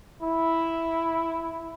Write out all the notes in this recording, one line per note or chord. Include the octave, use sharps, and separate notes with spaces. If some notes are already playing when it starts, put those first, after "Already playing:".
E4